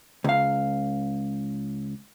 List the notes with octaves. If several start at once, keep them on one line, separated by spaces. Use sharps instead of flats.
C#2 F5